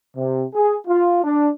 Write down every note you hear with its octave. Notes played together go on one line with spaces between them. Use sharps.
C3
G#4
F4
D4